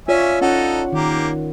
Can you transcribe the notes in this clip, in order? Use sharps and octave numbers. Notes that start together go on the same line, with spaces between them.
C#4 F4 C#5 D5 E5 G#5
C#4 D#4 F4 A4 F#5
D#3 A#3 G4